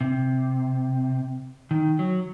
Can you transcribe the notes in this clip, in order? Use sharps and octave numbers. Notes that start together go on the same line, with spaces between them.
C3
D#3
F#3